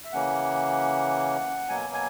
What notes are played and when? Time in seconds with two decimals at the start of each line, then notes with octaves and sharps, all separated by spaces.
0.05 E5
0.13 C#3 E3 A#3 C#4 F#5
1.69 B2 F#3 A#3 G#5
1.94 G#5